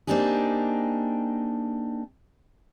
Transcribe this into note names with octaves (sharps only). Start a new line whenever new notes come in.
A#3 C4 D4 D#4 G4 G#4